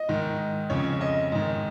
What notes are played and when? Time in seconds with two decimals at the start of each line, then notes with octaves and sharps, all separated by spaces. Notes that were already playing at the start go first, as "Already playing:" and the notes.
Already playing: D#5
0.09 G#2 D#3
0.70 F2 C#3 C#5
1.01 D#5
1.32 G#2 D#3